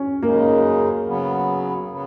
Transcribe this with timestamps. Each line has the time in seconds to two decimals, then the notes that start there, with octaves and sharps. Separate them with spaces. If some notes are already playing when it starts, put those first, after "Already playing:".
Already playing: C#4
0.22 F#2 C#3 G#3 A#3 D#4
1.06 C#3 F#3 B3
1.90 C#3 F#3 B3